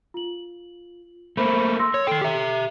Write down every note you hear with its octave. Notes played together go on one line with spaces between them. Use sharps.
F4 F#7
A3 A#3 C5 B5
C6 E6 A#6
C#5
D#3 A4 G5 C7
G4 E5